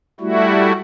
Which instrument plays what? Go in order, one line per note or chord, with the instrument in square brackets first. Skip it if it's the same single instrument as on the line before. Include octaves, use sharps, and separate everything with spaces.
[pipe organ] G3 A3 E4 F#4